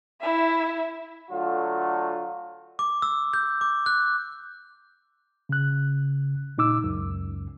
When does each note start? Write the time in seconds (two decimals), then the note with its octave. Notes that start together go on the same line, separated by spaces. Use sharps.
0.20 E4 E5
1.30 D3 F#3 A3 F4
2.79 D6
3.02 E6
3.34 G6
3.61 D6
3.86 F#6
5.49 C#3 F#6
6.58 A#2 D#4 D6 E6
6.84 C#2 F#2